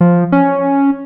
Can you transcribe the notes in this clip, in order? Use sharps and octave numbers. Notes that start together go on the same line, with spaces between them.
F3
C#4